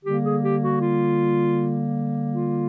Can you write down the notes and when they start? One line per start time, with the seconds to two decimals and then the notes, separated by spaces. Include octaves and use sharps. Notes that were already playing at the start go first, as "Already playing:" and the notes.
0.04 D3 G3 A#3 G4
0.22 G#4
0.42 G4
0.61 F#4
0.80 F4
2.31 F4